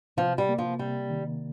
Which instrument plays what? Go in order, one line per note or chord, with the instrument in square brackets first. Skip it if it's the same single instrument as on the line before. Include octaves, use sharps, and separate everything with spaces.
[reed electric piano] C3 [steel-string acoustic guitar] F3
[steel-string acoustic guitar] G3
[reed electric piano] A#3
[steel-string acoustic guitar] F3
[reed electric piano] C3 [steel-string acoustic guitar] G3
[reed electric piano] D#3